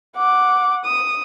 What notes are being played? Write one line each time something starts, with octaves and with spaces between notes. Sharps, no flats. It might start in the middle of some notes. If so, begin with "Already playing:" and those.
F#5 D6
D#6